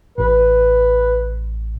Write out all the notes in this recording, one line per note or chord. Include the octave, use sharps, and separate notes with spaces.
A1 A2 B4